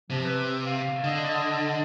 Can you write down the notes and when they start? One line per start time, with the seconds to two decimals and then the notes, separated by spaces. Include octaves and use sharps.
0.10 C3 F3
0.24 B4
0.66 F5
1.04 D3 D#5
1.31 D#5